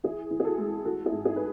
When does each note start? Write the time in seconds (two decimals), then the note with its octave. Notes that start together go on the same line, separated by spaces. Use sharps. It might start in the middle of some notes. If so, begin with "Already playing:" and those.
0.04 E3 E4 G#4
0.31 E3
0.40 G#4
0.45 F#4 A4
0.58 G#3
0.85 E3 F#4 A4
1.06 E4 G#4
1.12 G#2
1.25 E4 G#4
1.36 B4